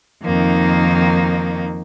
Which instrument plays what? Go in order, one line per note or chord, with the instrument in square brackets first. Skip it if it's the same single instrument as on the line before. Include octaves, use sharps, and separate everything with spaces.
[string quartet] F2 D#3 A#3 D#4